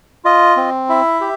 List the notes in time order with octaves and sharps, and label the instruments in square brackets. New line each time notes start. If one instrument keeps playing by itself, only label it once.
[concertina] F4 D#5
C4
E4 E5
G4